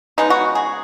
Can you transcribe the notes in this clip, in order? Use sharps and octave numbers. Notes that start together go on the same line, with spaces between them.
C#3 G#3 B3 D#4
F#4
G#4